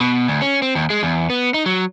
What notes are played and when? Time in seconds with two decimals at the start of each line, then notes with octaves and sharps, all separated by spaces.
0.01 B2
0.28 D2
0.42 C#4
0.62 C4
0.75 D#2
0.90 G#3
1.03 E2
1.30 B3
1.54 D#4
1.66 F#3